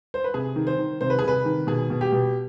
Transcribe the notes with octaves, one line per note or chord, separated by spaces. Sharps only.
C5
B4
C3 G#4
D#3
C5
D#3
C3 C5
B4
G#4
C3 B4
D#3
B2 G#4
B2
G4
B2